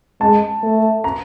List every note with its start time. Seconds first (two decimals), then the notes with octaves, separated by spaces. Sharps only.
0.21 G#3 A5
0.63 A3
1.04 A#5